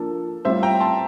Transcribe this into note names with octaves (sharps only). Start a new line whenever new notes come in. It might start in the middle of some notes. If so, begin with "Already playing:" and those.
Already playing: F3 A#3 D4 A4
A2 G3 C4 F4 C5 E5
G5 A#5
A5 C6